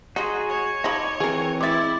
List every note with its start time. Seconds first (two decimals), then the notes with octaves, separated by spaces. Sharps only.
0.16 G#3 D#4 F#4 G#4
0.49 C#5
0.84 F3 D#4 D#5 B5 D6
1.20 E3 C4 G#4 A#4
1.61 G#3 E4 E5 D6 A6